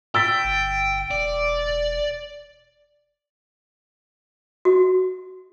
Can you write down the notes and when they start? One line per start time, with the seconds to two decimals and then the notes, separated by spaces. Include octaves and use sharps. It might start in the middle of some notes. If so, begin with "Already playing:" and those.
0.15 G5 E6 A6 B6
0.44 G1
1.11 E1 D5
4.65 F#4